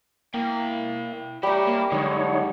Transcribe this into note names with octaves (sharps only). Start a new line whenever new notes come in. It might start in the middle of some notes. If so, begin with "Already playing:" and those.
A#3 E4 G5
G3 E4 G4 C#5 A#5
A#3
D3 F#3 G#3 D#4 C#5